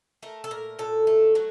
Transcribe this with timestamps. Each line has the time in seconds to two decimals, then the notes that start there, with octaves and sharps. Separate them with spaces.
0.23 A3 A#4
0.44 A4
0.51 A#2 A#4
0.79 A#2 A4
1.07 A3
1.35 F#3 F#4